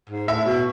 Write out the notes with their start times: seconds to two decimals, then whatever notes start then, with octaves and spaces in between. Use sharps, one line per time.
0.09 G#2
0.28 A2 E5
0.46 B2